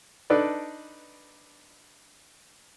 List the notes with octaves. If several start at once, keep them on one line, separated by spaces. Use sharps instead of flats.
D4 D#4 A4 B4 D5